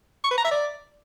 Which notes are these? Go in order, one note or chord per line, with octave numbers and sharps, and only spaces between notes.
C#6
B4
A#5
E5
D5